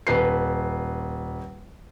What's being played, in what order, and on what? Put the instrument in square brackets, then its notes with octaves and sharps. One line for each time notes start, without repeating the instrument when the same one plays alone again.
[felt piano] D#1 B4 C7